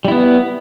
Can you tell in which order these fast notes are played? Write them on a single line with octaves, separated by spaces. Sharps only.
G3 E4 B3